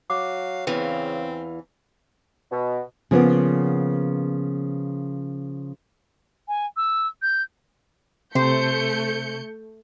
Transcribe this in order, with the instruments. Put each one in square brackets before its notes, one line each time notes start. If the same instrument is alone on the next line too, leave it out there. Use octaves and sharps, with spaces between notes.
[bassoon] F#3 [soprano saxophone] F5 [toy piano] D6
[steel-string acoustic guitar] E2 E3 F5 [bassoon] C#3 [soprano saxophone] C4 [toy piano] B4
[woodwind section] B2
[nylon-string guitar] C#3 F3 A#3 B3
[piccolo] G#5
E6
G6
[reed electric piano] C3 [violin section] A3 G6 C#7 [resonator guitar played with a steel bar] C5